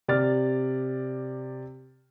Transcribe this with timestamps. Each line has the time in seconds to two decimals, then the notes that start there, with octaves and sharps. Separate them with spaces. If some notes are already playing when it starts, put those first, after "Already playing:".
0.08 C3 D5 F6 A6